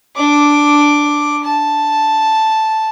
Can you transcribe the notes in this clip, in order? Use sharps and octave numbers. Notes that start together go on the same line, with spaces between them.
D4 D6
A5